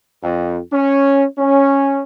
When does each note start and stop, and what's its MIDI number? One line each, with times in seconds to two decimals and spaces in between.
0.23 0.58 41
0.72 1.25 61
1.38 2.02 61